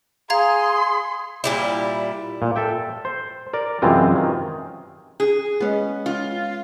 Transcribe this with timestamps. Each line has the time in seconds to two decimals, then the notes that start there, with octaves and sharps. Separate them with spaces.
0.30 G#4 F5 A#5 C6 G#6
1.44 A#2 G3 E4
2.42 A#2
2.56 A4 E5 G5
3.05 C5
3.53 A#4 D5
3.82 F#2 C3 E3 G#3 C4 F4
4.16 D#3
5.20 G#4
5.60 G#3 B3 C#4 D#5
6.06 F4